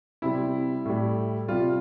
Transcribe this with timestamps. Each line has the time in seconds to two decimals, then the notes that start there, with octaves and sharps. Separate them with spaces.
0.22 C3 G3 E4
0.85 A2 G3
1.48 C3 G3 F4